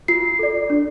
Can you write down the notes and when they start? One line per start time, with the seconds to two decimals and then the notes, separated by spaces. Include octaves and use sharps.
0.08 F4 C7
0.39 A4 D5
0.70 D4